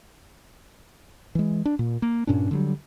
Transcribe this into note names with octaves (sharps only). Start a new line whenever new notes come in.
E3 G#3
D4
A#2
A#3
G2 A#2 C#4 D4
D3 F#3 G3